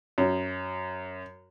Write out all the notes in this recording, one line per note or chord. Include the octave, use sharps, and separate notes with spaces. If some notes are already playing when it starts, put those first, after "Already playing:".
F#2